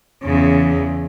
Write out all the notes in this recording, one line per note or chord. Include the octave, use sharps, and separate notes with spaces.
E2 C#3